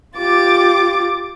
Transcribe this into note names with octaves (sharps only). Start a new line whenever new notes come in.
F4 G4 D6 A6